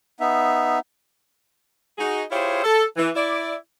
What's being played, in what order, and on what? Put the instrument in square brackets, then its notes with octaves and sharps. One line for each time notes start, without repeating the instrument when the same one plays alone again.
[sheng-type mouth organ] B3 D#4 E5
[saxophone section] D#4 F#4 G#4
E4 F4 G4 G#4 C5 C#5
A4
E3
E4 D5